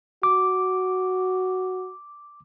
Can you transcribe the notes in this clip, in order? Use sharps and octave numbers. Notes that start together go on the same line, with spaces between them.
F#4 D6